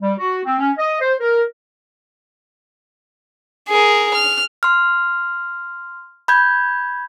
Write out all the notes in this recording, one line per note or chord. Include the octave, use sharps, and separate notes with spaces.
G3
F#4
C4
C#4
D#5
C5
A#4
G#4 A#4
F6
C6 F6
B5 G6 G#6